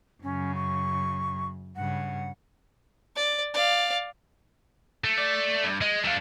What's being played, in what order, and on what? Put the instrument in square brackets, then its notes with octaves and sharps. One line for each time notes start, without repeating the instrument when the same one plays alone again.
[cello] F#2 C#3 [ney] C#4
[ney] C#6
[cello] G2 C#3 [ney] F#5
[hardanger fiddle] D5
D5 F5
[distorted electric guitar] A3
[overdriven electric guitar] D5
G2
[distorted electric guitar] G#3 [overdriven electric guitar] D#5
[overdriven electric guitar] G2 F5 [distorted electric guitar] A3 D4